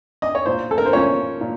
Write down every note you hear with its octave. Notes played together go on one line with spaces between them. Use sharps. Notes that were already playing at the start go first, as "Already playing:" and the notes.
D#5
C#5
A#2 C5
A4
A#4
C5
F3 A#3 C#4 C#5
A#2